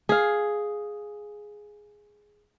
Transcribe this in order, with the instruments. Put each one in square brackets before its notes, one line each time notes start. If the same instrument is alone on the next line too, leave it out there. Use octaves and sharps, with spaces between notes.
[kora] G#4 F5